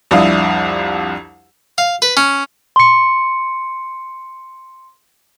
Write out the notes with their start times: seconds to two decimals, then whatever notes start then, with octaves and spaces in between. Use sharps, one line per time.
0.11 C2 F2 D4 E4 F5 D#6
1.78 F5
2.02 B4
2.17 C#4
2.76 C6 C#7